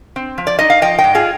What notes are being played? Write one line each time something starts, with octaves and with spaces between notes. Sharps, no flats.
C4
F3
D5
D#4 D#5
F5
F3 D#5 G5
D#5 G5
G#2
F4 G#4